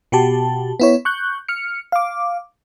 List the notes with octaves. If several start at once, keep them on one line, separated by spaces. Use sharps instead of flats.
B2 F#4 G4 A5
B3 E4 C#5
C#6 F#6 G6
F6 C#7
F5 D6